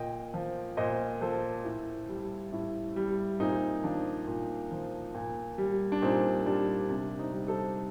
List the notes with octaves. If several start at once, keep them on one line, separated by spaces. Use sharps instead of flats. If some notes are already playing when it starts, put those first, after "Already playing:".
Already playing: A#2 D#5 G5
F3
A#2 C5 D#5
F3 A4 C5
A2
G3
A2
G3
A#2 C4 D#4
F3 D4
A#2
F3
A#2
G3
D4
A#2 C4 D#4
G3 D4
C3 D4
C4 D#4
G3
A4 C5